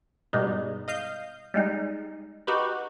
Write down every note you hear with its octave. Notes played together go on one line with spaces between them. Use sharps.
G2 B2 G3 G#3 D#4
D#5 F5 G6
G3 G#3 D#4
D#4 F#4 G4 B4